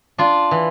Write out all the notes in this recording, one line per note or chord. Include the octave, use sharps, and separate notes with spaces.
D4 F4
E3